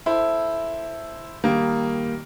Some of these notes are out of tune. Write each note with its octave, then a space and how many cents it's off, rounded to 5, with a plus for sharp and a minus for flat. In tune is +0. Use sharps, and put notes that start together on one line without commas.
E4 +0 A4 +0 C5 +0
D#3 +0 G3 +0 A#3 +0